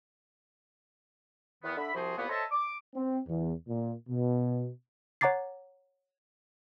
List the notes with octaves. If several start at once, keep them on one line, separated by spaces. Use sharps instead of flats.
E2 D#3 B3
D3 E5 B5
C2 C3 F3 F#4 G#4 C5
C2 A#2 A#3 B3
A4 C5 C#5 D#5 E5 A5
D6
C4
E2
A#2
B2
C#5 F#5 A#5 D6 A6 C7